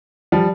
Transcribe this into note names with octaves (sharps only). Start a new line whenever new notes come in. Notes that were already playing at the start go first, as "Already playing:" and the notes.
F3 G3